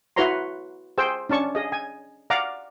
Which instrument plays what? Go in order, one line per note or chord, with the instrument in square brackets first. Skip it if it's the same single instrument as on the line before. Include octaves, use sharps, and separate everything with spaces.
[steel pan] E4 F#4 B4 C#5 A#5 C6
G#4 C5 G5 E6
C#4 D4 A5 C#6
G#4 D#5
G#5
D5 F5 F#5 A#5 D6